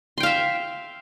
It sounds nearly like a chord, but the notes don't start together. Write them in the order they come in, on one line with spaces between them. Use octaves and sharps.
C6 G5 F5 E5